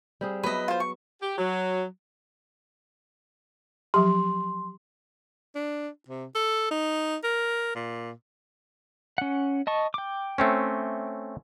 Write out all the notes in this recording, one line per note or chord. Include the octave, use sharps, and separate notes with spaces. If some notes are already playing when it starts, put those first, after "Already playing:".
G3 C4 G#4
F#3 B3 B4 D#5 E5
F4 C5
C#6
G4
F#3
F3 F#3 G4 C6
D4
C3
A4
D#4
A#4
A#2
C#4 F#5
D#5 A5 C#6
G5 D6
A3 C4 C#4